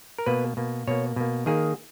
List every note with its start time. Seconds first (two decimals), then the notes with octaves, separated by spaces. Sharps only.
0.19 A#4
0.26 B2 A#3 B4
0.57 B2 A#3
0.87 B2 A#3 C#5
1.16 B2 A#3
1.46 D#3 A#3 G#4